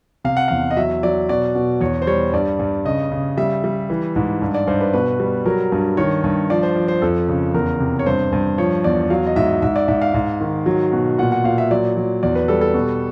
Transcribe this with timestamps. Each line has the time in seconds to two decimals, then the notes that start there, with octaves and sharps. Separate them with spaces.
0.25 C3 F5
0.37 F#5
0.48 E2 F5
0.71 D#5
0.77 F#3 E5
1.03 F#3 D5
1.29 B2 D5
1.55 B2
1.81 E2 C#5
2.02 C5
2.07 G3 C#5
2.33 G2 D5
2.59 G2
2.85 C#3 D#5
3.12 C#3
3.37 G3 E5
3.64 G3
3.90 E3
4.16 G#2
4.42 G2
4.54 D5
4.67 G2 C5
4.81 B4
4.93 B2 B4
5.20 G3
5.46 F#3 A#4
5.72 G2
5.97 D#3 C#5
6.24 G2
6.50 F3 D5
6.63 C5
6.76 F3
6.88 C5
7.02 F2 A4
7.28 C#3
7.54 E2 A#4
7.80 C3
7.99 C#5
8.06 G2 C5
8.32 G2
8.58 F3 C#5
8.84 E2 D5
9.10 F#3 F5
9.27 D#5
9.36 G#2 E5
9.62 G#2 E5
9.76 D5
9.88 G#2 E5
10.02 F5
10.14 G#2
10.41 D#3
10.66 F#3
10.93 B2
11.18 A#2 F#5
11.32 F#5
11.44 A#2 F5
11.58 E5
11.71 F#3 D5
11.97 F#3
12.23 E2 D5
12.36 B4
12.48 G3 A4
12.61 A4
12.74 B2